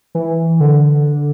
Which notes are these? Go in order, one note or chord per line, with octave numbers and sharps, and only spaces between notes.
E3
D3